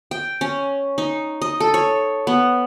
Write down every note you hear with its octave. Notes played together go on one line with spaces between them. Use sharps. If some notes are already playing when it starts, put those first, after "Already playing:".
G5
C#4
D#4
D#5
A4
C#5
B3